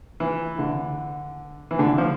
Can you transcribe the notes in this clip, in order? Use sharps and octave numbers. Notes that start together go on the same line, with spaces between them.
E3
D3
E3
D3
F3